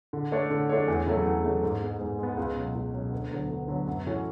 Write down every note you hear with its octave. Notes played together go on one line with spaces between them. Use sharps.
D3
A3 D4 A4 C#5
D3
A3 D4 A4 C#5
E2
C#3 F#3 A3
E2
C#3 F#3 A3
G#2
G#3 B3
G#2
G#3 B3
C#2
B2 F#3
C#2
B2 F#3
D2
D3 F#3 B3
D2
D3 F#3 B3
F#2
E3 A3 C#4 F#4